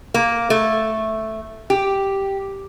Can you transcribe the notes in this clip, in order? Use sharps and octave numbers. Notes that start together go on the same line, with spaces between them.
A#3
A3
G4